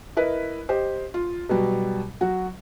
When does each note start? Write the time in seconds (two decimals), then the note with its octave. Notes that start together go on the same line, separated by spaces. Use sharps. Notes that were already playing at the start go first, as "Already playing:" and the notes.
0.17 E4 A#4 B4 D#5
0.69 G4 C5 D#5
1.14 F4
1.49 B2 F#3 G3
2.21 F#3 F#4